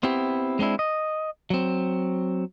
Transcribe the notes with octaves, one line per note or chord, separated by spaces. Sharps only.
B3 C4 E4 G4
G#3 C4 D4 E4
D#5
F#3 C4